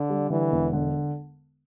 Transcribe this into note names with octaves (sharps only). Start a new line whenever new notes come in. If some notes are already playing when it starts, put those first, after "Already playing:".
Already playing: D3
G3
D3 E3
E1
D3